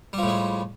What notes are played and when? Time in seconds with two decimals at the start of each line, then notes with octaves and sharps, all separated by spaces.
0.13 G3
0.18 F3
0.23 A2
0.28 G#3